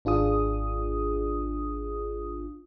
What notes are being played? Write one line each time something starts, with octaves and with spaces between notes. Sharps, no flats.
G#1 D4 F4 G#4 D#6